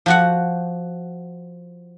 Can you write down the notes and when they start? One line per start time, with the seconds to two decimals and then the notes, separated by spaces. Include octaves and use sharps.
0.06 F3 F#4 F#5